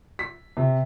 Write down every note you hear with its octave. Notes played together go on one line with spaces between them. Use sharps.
B6
C3